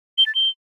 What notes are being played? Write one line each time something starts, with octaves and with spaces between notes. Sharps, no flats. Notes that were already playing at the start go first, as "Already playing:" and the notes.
G7
A6
G7